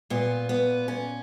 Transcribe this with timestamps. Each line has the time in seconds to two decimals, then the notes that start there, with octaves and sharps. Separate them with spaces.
0.10 A#2 B3
0.49 B3
0.88 C#4